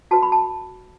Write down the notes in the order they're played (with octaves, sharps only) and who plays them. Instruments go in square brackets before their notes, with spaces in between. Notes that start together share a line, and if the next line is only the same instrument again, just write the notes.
[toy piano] F#4 B4 A5
B5
A5